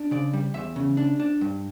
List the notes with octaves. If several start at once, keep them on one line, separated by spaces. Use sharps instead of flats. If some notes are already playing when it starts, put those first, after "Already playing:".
Already playing: D4
C#3 D5
G3
E2 E5
C#3
D4
D4
G2